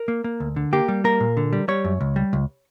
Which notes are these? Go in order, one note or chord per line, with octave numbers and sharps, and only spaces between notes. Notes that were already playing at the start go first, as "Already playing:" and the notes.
Already playing: A#4
A#3
A#3
D2
D3
A#3 G4
G3
A#3 A#4
A#2
D3
G3
G3 C#5
F#2
C#2
G3
C#2